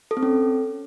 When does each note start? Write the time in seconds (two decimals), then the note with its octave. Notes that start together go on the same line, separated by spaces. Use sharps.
0.11 A4
0.17 C4
0.23 C#4